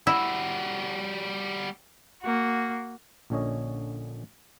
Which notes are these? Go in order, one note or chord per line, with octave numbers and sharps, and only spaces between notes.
G3 E4 F#4
A#3 F#4
A#1 A#2 D3 C#4 C#5 D#5